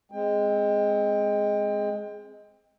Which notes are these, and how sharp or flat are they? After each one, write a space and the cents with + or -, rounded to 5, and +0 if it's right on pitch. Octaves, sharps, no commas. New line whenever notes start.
G#3 +0 C4 +0 G5 +25